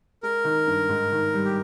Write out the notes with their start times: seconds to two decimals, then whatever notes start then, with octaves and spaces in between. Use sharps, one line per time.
0.23 G#3 A#4
0.45 D#3
0.67 G2
0.89 G#2
1.12 D#3
1.34 G3
1.45 G4